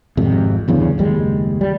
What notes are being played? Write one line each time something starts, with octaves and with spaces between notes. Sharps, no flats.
G#1 F2 C3
D1 E2 G2 C#3
F#1 D#2 G3 G#3
G3